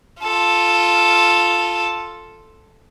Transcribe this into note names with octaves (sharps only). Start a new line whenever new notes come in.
F4 A4